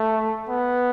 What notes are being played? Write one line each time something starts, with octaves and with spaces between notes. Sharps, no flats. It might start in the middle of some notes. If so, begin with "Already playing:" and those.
Already playing: A3
B3